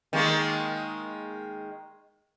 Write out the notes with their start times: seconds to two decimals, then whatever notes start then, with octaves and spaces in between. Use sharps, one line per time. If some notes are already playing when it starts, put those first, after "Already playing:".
0.13 D#3 G#3 A#3